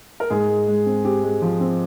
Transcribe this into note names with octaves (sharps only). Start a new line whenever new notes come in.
A#4
G#2 G#4
G#3
G#3
C4
C4 G4
G#3
F3
C4